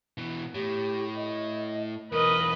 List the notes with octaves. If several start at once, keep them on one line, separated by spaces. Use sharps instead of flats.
B2 E3
A2 G4
D#5
B1 E2 A#4 B4 D#5